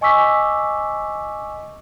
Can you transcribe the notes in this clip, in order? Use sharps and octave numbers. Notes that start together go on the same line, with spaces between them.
D#5 G#5 C#6 D6 E6 B6